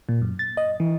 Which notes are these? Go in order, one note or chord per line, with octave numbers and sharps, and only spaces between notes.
A#2
F#2
A6
D#5
E3